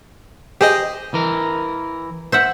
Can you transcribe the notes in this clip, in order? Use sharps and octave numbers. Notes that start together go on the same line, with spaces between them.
G4 G#4 C5 D#5
E3 A#4
C5 E5 F#5